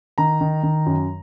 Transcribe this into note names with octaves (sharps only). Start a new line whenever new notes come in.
D#3 A#5
D#3
D#3
F#2